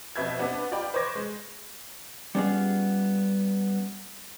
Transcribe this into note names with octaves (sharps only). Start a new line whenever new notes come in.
F2 B2 B4 E5 G6 G#6
B3 C4 D4
F4 D5 G5 B5
B4 C5 C#6 D6 G#6 A#6
G#3
G3 B3 C#4 D#4 F4 G#4